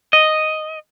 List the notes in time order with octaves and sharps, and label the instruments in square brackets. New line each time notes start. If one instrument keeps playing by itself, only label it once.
[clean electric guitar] D#5